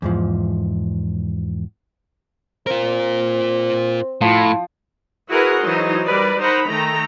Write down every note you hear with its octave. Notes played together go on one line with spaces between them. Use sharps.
E2 G#2 F3
C4 F4 A#4
A2 F3
E4 F#4 G#4 A#4 B4 F#5
E3 F#3 D#4 C5
G3 A#4 B4 D5
D#4 A#4 C5 F#5 A#5 B5
D#3 A3 A4 G5 A#5